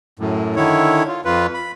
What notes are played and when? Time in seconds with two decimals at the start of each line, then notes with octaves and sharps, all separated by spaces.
0.19 F#2 A2
0.56 D3 D#3 E4 C#5
1.08 F4
1.25 F2 F4 B4
1.54 B5